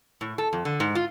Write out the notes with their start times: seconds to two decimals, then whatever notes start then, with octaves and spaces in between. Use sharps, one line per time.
0.21 A2
0.38 A4
0.53 F2
0.65 D3
0.80 G#2
0.95 F4